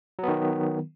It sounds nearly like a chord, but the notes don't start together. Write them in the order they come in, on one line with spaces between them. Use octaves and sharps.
F#3 B3 D#3